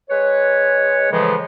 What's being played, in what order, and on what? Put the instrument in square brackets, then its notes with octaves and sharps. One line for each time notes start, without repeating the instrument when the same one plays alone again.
[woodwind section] G#3 B4 C#5
A2 C#3 E3 F3 G#3